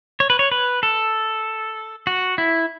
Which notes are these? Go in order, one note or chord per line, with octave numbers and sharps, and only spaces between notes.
C#5
B4
C#5
B4
A4
F#4
E4